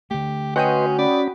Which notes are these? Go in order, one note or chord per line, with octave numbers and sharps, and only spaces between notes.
D3 A3 G4
C#4 F#4 B4 D#5 G5 C6 D#6
C#4 D5 B5